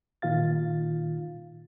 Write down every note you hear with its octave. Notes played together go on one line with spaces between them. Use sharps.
A#2 D#3 F4 F5 A6